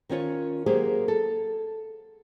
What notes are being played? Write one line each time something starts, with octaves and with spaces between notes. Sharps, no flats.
D#3 C#4 F4 C#5
F#3 A#3 G4 G#4 C5
A4